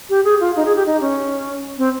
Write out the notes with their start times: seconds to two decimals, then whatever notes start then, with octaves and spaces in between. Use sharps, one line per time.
0.10 G4
0.24 G#4
0.40 F4
0.56 D#4
0.65 G#4
0.76 G4
0.86 D#4
1.01 C#4
1.78 C4